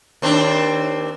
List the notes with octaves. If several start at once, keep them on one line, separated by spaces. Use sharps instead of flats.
D#2 C4 D4